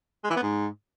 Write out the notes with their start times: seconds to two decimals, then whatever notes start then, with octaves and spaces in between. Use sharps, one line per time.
0.24 G#3
0.30 E3
0.36 B3
0.42 G#2